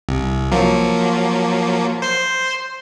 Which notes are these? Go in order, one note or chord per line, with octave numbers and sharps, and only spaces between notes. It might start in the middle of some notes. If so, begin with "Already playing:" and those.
C2
F3 F#3 A#3
C5 C6